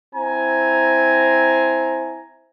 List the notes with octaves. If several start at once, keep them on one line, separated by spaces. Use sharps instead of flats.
C4 E4 G#5 A#5